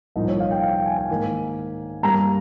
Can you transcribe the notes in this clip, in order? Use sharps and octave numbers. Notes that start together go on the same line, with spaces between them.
C2 A#2 F3 D#4
C#5
F5
G5
F5
G5
G#5
G#5
G#2 D#3 A#3
G2 G3 A#3 A#5